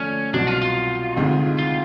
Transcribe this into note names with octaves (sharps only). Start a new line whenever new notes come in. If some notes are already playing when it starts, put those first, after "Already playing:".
Already playing: D3 F3 A3 C#4 D4
C2 B2 F#3 D4
F4
F4
D2 C3 D#3 G#3
F4